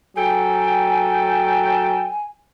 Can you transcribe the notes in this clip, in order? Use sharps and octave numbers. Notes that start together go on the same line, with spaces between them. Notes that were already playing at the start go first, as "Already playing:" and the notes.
F#3 A4 G5 G#5